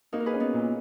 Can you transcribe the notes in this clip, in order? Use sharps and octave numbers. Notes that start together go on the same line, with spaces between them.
A#3 D#4 F#4
A#4
G#4 B4
C#4
B3 D#4
A#2